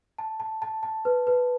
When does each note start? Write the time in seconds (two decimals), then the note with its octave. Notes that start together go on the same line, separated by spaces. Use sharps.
0.19 A5
0.40 A5
0.62 A5
0.83 A5
1.05 B4
1.27 B4